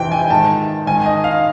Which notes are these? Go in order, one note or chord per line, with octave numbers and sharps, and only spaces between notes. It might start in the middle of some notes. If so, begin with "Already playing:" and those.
Already playing: F2 C3 E3 G5
G#5
G#2 D#3 A5
G#2 D#3 G#5
D#5
F5